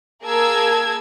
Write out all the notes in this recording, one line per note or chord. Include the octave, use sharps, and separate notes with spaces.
A#3 G#4 A#4 A5 E6 G#6